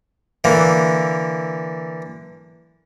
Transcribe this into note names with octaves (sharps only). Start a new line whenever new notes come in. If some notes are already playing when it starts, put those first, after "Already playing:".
D3 E3 A#3